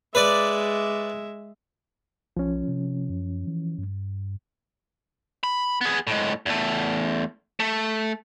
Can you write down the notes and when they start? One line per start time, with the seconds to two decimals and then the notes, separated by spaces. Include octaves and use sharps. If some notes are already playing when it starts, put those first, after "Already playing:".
0.15 G#3 B4 D5 E5
2.37 B1 F3 C#4
2.68 C3
3.10 F#2
3.47 E3
3.78 G2
5.44 B5
5.81 B3 G#4
6.07 A2 G#3
6.46 E2 A3
7.60 A3